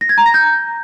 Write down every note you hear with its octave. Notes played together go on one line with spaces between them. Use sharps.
A#6
G#6
A#5
A#6
G6